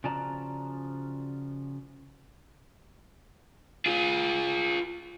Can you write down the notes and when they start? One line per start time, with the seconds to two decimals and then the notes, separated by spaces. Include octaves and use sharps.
0.04 C#3 F3 F#4 D5 A5 A#5
3.86 F4 G#4